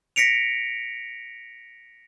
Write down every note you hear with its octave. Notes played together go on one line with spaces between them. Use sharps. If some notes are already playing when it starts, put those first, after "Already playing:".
A#6 B6 C#7 D7 F7